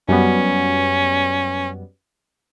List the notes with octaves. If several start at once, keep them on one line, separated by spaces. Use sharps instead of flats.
F#2 G3 B3 C#4